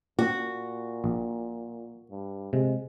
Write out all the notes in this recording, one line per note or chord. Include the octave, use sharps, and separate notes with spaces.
A#2 F#4
A#1
G2
C3 G#3